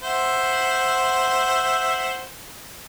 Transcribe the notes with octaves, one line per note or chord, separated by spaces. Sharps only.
C5 E5 F#5